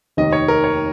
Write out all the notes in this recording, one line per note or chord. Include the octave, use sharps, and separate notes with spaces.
F1 D#2 D#3 D#5
C#5
A#4
C#5